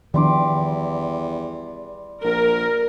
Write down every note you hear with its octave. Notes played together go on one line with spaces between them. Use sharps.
E2 D#3 F3 G3 D4 C6 D6
A#1 A#4